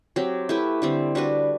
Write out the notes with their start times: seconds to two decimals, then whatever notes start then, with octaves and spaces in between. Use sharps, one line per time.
0.16 F#3 C4 G4
0.49 A3 E4 G4 B4
0.82 D3 G3 C4
1.15 G3 D4 F#4 B4